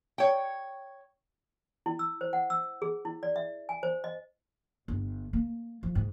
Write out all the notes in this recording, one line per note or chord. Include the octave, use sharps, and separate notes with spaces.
C#5 G5
E4
E6
C5
F#5
E6
G#4
E4
D5
E5
G#5
C5
D#5
G1
A#3
F3
G#2